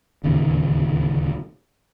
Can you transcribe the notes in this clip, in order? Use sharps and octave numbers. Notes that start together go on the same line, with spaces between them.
D1 D#2 C#3